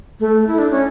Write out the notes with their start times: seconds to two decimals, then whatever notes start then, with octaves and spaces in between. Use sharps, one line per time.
0.20 A3
0.47 E4
0.59 D4
0.71 C#4